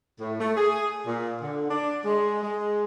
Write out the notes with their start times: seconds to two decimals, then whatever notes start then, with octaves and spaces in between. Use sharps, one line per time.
0.20 A2
0.40 A3
0.56 G#4
1.06 A#2
1.42 D3
1.70 D4
2.04 G#3
2.43 G#3